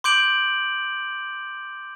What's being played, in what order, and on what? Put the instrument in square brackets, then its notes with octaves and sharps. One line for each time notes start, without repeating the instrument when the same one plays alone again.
[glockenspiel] C6 D6 G6 D7 F#7